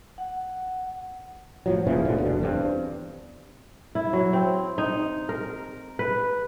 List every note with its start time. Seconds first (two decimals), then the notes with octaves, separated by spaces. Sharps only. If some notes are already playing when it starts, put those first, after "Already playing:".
0.18 F#5
1.66 A2 F3 F#3
1.87 A#2 C#3 E3 F3
2.05 D2 G#2 B2 D3
2.18 F1 B2 D3
2.41 E2 G2 C4
3.95 E4
4.13 F#3
4.33 C4
4.78 D#4
5.29 A#4
5.99 B4